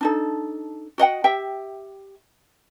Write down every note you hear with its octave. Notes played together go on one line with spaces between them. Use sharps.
D4 D#4 A4
F#4 D#5 F#5 G5
G4 E5 G5